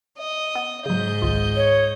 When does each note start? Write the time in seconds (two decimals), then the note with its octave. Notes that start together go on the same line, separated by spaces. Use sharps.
0.18 D#5
0.55 B3
0.86 G#2 C#3 F#3 D#5 G6
1.22 G#1 C#2 F4
1.56 C#5